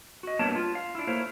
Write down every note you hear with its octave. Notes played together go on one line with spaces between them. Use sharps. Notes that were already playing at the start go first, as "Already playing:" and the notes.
F#4 D#5
G2 A#3 B3 C#5 A5
F4
F5
D4 E4
A3 A#3 E4 C5 C#5 F5